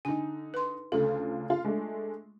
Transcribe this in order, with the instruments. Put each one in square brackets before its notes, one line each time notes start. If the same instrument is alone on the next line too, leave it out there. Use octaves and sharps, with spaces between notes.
[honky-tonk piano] D3 D#4 [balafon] G#5
[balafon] B4 C6
[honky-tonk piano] D2 C#3 F4 [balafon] A4
[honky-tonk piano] F4
G#3 A3 D4